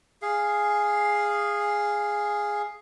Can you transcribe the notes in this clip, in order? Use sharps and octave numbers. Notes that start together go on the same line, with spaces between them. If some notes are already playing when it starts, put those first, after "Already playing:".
G#4 F5